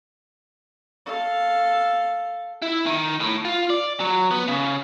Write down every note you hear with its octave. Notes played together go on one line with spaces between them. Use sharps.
A4 F5
E4
D#3
A2
F4
D5
F#3
B3
C#3